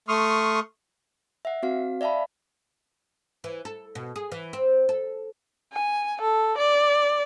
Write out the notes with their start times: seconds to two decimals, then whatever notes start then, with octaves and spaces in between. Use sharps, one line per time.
0.08 A3 C6 C#6 D#6 F6
1.45 E5 F#5
1.63 C4 F#4 F5
2.01 D5 E5 F5 A5 B5
3.44 E3
3.65 A4
3.95 B2
4.16 G#4
4.32 E3
4.53 C4
4.89 A4
5.73 G#5
6.21 A4
6.58 D5